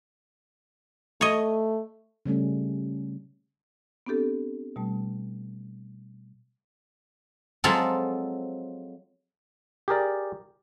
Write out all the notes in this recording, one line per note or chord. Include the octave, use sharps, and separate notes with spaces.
A3 C#5 D#5
C#3 G3 A3 C#4
B3 C4 D4 G4 A4
B2 G3 A3 A5
F3 F#3 G#3 C4 F4 A4
G4 G#4 A#4 D5